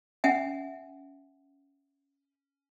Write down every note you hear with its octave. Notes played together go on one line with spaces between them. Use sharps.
C#4 E5 F#5 G#5